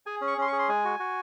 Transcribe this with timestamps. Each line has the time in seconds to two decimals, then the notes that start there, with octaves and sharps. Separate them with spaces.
0.06 G#4 G#5
0.21 C#4
0.27 C#6
0.38 C#4 C6
0.48 C#6
0.53 G#4
0.59 C6
0.68 G#3 G#5
0.85 F#4
0.99 F#4